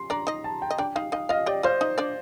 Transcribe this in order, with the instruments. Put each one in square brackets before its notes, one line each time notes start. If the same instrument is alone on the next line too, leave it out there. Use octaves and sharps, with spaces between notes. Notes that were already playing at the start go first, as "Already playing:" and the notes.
Already playing: [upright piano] C6
[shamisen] D4 D5 [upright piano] A#5
[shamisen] D#4 D#5
[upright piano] A5
G5
[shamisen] D#5
[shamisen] D4 D5 [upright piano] G5
[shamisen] D#4 D#5 [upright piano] F5
[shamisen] D#4 D#5 [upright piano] F5
[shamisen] F4 F5 [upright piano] D#5
[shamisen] G4 G5 [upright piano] D5
[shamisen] F4 F5 [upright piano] C5
[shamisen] D#4 D#5
D4 D5